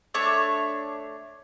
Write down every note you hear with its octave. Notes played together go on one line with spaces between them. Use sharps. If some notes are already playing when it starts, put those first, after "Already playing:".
A3 D4 C#5 E6